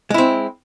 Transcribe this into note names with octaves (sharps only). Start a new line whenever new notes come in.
G#3 C4 E4